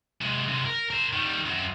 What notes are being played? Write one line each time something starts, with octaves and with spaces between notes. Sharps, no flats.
C3 G#3
C3 G#3
A#4
A#4 C5
D#3 G3
F#2 C4